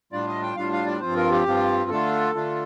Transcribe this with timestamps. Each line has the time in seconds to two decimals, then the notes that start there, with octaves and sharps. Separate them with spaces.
0.12 A2 G3 D4 F4 D5
0.28 D#5
0.43 G5
0.56 A2 G3 D4 F4 F5
0.72 F5
0.86 D5
1.01 G2 F3 C4 F4 C5
1.16 A#4
1.31 G4
1.46 G2 F3 C4 F4
1.90 D3 A3 D4 F4 A4
2.35 D3 A3 D4 F4